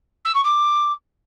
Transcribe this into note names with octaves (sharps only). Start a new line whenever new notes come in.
E6
C#6
D6